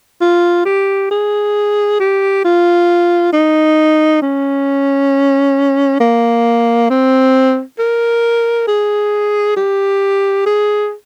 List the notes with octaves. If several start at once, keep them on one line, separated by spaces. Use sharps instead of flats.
F4
G4
G#4
G4
F4
D#4
C#4
A#3
C4
A#4
G#4
G4
G#4